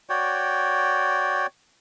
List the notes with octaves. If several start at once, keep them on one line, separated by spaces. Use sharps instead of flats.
F#4 C#5 D5 G5